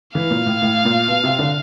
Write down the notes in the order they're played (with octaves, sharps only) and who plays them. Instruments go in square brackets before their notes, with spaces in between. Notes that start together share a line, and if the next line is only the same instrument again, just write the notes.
[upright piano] E3 [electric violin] F5
[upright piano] A#2
A2
A2
A#2
B2
C3
D3